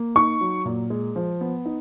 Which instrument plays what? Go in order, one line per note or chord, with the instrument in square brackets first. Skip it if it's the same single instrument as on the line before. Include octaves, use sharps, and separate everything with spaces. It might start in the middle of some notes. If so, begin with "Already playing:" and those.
Already playing: [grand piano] A#3
[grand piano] D#4 [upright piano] C#6
[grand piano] F#3
A#2
G#3
F3
B3
D#4